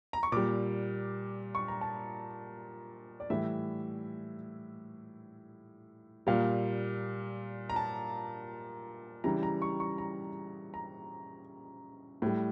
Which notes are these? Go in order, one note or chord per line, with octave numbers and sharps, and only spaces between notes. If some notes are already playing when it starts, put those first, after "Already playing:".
A#5
C#6
A#2 G3 D6
C#6
A#5
A5
D5
A2 E3 G3 E5
A#2 G3 F5
A#5
A5
C#3 E3 G3 A#5
A#5
C#6
C#6
A#5
A#5
A2 G3